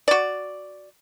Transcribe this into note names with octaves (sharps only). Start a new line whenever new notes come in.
F#4 D5